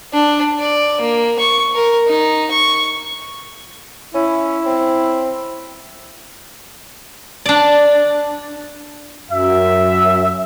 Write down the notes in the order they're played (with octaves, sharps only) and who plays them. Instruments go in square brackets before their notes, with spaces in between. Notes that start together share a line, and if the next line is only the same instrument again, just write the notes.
[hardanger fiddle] D4
D5
A#3
C#6
A#4
D#4
C#6
[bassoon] C#4 [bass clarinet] E4
[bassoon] C4
[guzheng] D4 D5
[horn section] F#2 E5